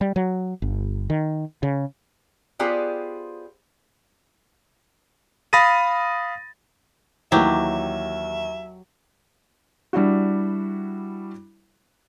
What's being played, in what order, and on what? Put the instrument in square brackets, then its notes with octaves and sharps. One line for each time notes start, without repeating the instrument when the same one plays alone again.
[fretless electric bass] G3
F#3
G1
D#3
C#3
[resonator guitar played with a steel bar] B3 F4 G4 G#4 C5 D5
[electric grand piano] F5 B5 D#6 A6 A#6 D#7
[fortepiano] D#2 E3 [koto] F#3 G4 [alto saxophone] E5
[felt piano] G3 D4 E4 F#4